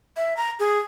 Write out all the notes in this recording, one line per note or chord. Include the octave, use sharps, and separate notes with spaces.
E5
A#5
G#4